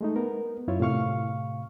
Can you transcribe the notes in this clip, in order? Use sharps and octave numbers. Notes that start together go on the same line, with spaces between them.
G#3 A3 D#4
B3 A#4
F#2 E4 F4 C#5
A2 C3 F5 C#6 F6